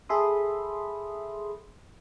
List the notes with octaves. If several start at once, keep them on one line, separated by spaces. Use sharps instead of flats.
G#4 A4 E5 B5 C6 D#6